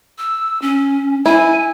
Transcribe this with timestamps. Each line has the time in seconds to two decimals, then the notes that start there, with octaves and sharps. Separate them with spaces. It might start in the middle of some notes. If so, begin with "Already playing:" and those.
0.18 E6
0.62 C#4
1.26 E4 G#5